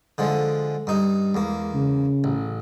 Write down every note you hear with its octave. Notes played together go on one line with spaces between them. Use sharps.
D3 F3 G#3
G2 D#4
E2 G#3 A#3
C#3
A1